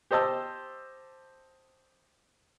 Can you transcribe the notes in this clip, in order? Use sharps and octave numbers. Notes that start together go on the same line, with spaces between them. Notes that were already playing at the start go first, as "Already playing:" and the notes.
G4 C5 D#5 A5 E6